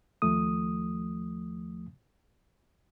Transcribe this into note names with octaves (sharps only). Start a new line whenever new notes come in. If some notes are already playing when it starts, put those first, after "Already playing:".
D#2 F3 A3 D#6